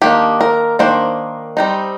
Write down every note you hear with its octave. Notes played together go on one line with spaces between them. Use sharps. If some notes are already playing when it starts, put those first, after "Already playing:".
D#3 A#3 D4 G4
A#4
D#3 A#3 D4 C5
G3 C4 D#4